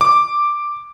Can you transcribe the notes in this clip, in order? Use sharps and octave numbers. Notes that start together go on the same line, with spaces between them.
D6